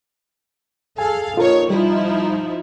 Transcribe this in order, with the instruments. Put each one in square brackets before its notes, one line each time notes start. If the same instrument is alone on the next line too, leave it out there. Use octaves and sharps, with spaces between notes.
[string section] G#4 A4 F5 [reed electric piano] G#5
[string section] A#1 D#4 C#5 [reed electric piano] F4 A4 A#4
[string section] F3 D#4 E4 [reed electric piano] G3